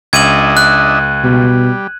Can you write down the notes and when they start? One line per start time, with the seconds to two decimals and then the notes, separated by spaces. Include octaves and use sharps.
0.13 C#2 D4 D#5 E5 G#6 D#7 F#7
0.57 F#6
1.24 B2 G3